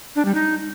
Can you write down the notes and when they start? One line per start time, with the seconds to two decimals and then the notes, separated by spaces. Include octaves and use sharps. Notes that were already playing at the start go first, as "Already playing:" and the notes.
0.16 D4
0.25 G3
0.35 D#4